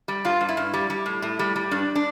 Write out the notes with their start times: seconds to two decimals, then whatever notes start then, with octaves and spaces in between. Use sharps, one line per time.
0.08 G3
0.25 G2 F4
0.41 G2
0.49 E4
0.57 G2
0.73 G3
0.90 G3
1.06 A2
1.22 A2
1.39 G3
1.56 G3
1.71 G2 D4
1.95 D4